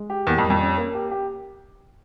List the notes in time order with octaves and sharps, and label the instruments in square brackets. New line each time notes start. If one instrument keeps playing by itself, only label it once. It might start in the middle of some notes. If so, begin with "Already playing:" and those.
Already playing: [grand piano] G#3
G4
[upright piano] E2 [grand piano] A#3
[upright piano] F2
[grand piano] G3
[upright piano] F2
[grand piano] C#4
A#3
G4
G4